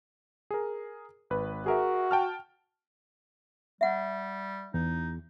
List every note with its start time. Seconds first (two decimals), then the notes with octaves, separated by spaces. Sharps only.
0.51 G#4 A#4
1.30 G#1 B4
1.66 F#4 G#4 A#4 E5
2.11 G5 A5 F6
3.81 G3 E5 F#5
4.74 E2 D#4